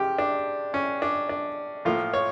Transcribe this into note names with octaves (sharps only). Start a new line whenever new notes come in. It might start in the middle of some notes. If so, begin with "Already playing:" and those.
Already playing: C#3 F3 G4
D4
C#4
D4
D4
A2 F3 A#3 F4
C#5